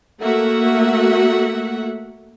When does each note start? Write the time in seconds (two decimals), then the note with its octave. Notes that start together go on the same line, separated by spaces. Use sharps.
0.21 A3 A#3 F#4 E5 F#5